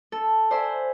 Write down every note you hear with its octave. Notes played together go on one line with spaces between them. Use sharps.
A4
C5 D5 E5 G#5 B5 C6